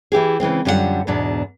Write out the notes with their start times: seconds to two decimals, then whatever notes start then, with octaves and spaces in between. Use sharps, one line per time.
0.12 E3 E4 G4 G#4
0.40 C#3 E3 G#3 C4
0.65 F#2 D3 G3 F4 G4 F#5
1.07 E2 G#2 B2 D4